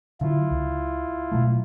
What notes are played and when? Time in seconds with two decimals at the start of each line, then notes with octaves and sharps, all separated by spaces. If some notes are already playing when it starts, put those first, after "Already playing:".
0.21 D3 F#3 E4 F4
0.51 C#2
1.32 B2 F#3 A3